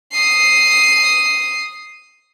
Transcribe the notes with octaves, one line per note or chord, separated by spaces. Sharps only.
D#6 C7